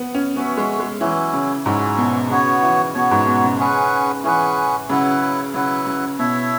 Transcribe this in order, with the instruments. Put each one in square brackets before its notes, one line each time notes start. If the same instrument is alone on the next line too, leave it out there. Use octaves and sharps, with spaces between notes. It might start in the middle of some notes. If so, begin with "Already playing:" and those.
Already playing: [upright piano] B3
C#4
[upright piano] B3 [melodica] C#4 F#4 E5
[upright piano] G#3
G#3
[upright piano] E3 [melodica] F#3 C#4 E4
[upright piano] C#3
[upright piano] G#2 [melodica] F#3 C#4 E4
[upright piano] B2
[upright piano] C#3 [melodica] B3 F#4 C#5
[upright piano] E3
[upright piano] B2 [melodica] C#5
[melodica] B3 F#4
[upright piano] G#2
B2
C#3
[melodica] C#4 G#4 B4 F#5
[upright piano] E3 [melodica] C#4 G#4 B4 F#5
[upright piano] C#3 [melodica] F#3 E4 B4 F#5
[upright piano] C#3 [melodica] F#3 E4 B4 F#5
[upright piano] C#3
[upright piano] B2 [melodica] E4 C#5 E5